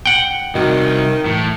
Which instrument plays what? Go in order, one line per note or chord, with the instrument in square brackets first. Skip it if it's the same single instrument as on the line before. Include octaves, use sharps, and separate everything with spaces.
[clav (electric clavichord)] F#5 G5
[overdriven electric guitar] C2 [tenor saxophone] D#3 [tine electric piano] F#4 D#5
[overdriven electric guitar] A2 [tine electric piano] E3